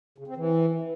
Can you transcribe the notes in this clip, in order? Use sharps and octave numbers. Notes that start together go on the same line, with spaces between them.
C#3
C4
E3